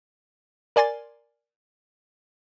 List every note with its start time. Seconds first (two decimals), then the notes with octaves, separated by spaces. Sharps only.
0.76 A#4 D5 G#5 C6 A6